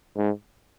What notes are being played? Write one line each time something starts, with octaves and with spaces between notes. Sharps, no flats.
G#2